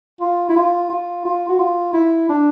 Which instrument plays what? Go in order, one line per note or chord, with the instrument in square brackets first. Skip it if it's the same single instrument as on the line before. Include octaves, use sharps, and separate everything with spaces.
[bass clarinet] F4
E4
F4
F4
F4
F#4
F4
E4
D4